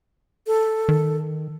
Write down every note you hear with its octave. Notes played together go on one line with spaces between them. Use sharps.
A4
D#3